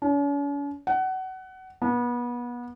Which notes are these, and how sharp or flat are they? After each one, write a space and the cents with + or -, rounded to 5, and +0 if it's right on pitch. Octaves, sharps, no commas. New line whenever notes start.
C#4 +45
F#5 +25
B3 -30